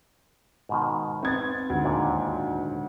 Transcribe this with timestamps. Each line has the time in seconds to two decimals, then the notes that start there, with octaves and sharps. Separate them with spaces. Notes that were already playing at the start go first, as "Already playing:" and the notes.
0.69 G#2 B2 D#3
1.23 B3 C4 D#4 G#6 A6
1.70 D2 G#2
1.84 D#2 A#2